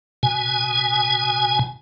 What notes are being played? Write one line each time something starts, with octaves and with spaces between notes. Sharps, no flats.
B2 G#5